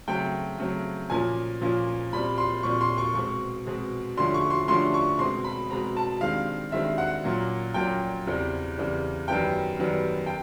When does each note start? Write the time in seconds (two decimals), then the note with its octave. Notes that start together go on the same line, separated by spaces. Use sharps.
0.08 C#3 F#3 A3 C4 G5
0.58 C#3 F#3 A3 C4
1.10 A#2 F3 A#3 C#4 G#5
1.61 A#2 F3 A#3 C#4
2.13 A#2 G3 C4 B5
2.38 C6
2.63 A#2 G3 C4 C#6
2.81 C6
2.98 C#6
3.14 B2 G#3 C4 C#6
3.66 B2 G#3 C4
4.17 G2 D3 F3 A3 C#4 C6
4.34 C#6
4.50 C6
4.68 G2 D3 F3 A3 C#4 C6
4.94 C#6
5.19 B2 G#3 C4 C6
5.44 B5
5.70 B2 G#3 C4 A#5
5.97 A5
6.21 G2 D#3 G#3 C4 F5
6.72 G2 D#3 G#3 C4 E5
6.98 F#5
7.24 A#2 F#3 A#3 C#4
7.74 A#2 F#3 A#3 C#4 G5
8.26 E2 C#3 E3 G3 C4
8.77 E2 C#3 E3 G3 C4
9.28 F#2 D#3 G3 B3 G5
9.79 F#2 D#3 G3 B3
10.26 G5